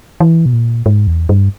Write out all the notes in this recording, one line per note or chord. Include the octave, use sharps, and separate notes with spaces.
E3
B2
A#2
G#2
E2
G2